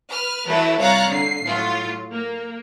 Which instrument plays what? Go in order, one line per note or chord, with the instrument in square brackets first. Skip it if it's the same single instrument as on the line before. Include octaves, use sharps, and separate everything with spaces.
[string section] B4 F6
E3 F#3 A3 E4 A4 B4
C2 C#5 F5 A#5 F#6 A6
D3 C7
A2 F#3 F4
A#3